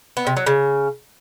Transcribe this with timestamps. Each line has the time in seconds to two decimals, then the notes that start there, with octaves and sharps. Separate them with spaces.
0.17 B3
0.27 C3
0.37 F#3
0.46 C#3